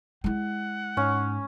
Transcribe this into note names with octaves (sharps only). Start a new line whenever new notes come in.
G#3 E4 F#5
G#2 C#4